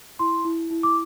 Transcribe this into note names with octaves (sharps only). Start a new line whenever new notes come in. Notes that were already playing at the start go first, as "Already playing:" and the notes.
E4 C6
E4
E4
D6